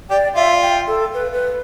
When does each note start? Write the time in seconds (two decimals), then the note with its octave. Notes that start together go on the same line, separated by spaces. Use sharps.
0.10 G4 D5
0.35 F4 E5
0.62 G5
0.87 A4
1.14 B4
1.33 B4